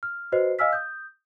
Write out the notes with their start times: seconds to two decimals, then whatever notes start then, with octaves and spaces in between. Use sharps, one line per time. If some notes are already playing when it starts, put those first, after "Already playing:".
0.03 F6
0.32 F#4 B4 C5 D#5 C7
0.59 D#5 F5 G#5 E6 F6 B6
0.73 D#6 G6